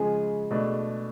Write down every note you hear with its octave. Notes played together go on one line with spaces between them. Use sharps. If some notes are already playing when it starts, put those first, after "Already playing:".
Already playing: C#3 F3 G#3 G#4
B2 A3 D4